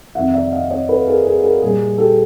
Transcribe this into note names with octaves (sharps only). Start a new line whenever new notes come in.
F2 C3 D#3 E5 F#5
D5 E5
D#5 F5
C#5 D#5
A4 B4
G#4 A#4
G#4 A#4
G#4 A#4
A#2 G3 G#4
G4 A4